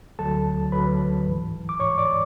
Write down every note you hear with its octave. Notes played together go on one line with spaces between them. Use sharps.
D2 D3 F#3 A4 A5
D2 D3 F#3 B4 B5
G#2 E3
D6
G#2 E3 C#5 C#6
D5 D6